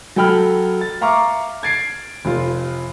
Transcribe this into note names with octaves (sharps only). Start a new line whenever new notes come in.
F#3 A4 G5 B5 F6
A6
E5 F5 A#5 C#6 D6 F6
G#6 A6 C7 D7
F1 F4